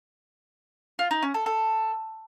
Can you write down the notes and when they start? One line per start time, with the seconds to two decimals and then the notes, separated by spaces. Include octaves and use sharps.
0.99 F4
1.11 D#4
1.22 C#4
1.34 A4
1.46 A4